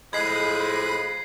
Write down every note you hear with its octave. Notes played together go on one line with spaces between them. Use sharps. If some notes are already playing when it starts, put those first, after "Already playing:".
A2 F3 G#3 B5 F#6 G#6 C7 D#7